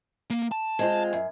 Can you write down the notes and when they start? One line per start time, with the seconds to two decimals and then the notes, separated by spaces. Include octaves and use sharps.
0.30 A#3
0.52 A5
0.79 G#3 C4 F4
1.13 F#2